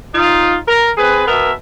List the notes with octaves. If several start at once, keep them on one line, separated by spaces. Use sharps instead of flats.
D#4 F4
A#4
C4 G#4 B4
B2 B3 A#4 E5